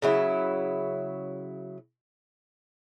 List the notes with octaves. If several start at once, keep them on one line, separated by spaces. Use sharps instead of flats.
C#3 F#3 E4